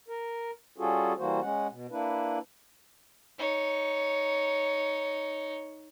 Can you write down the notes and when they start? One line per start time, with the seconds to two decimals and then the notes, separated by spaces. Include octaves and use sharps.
0.08 A#4
0.78 G3 C#4 F4 F#4 G#4 A4
1.18 E3 G3 A#3 F#4 C5
1.41 G#3 C#4 F#5
1.70 B2
1.91 A#3 D4 E4 B4
3.39 D#4 C#5